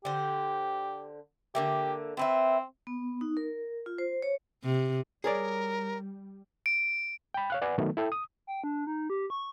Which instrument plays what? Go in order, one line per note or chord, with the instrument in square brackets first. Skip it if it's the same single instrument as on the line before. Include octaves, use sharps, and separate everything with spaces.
[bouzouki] D3 C5 [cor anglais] G4
[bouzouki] D3 A#3 E5 [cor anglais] G4
[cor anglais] C4 [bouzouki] E4 B4 E5
[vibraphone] B3
D#4
A#4
F4
C5
C#5
[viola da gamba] C3
[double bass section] G3 [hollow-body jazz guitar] G#4 C#5 D5 [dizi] A#4
[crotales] D7
[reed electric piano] G5 B5
C#5 F5 F#6
B4 D5 F#5 G#5
D#3 F#3 A3 B3
E4 A4 G5
D#6
[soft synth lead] G5
D4
D#4
G4
C#6